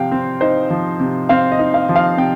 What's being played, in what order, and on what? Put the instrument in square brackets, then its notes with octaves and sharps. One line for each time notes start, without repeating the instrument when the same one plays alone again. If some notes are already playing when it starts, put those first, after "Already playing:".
Already playing: [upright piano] C3 F3 F5 G5
C4
D#4 C5
F3
C3
C4 F5
D#5
D#4
F5
F3
F5
C3 G5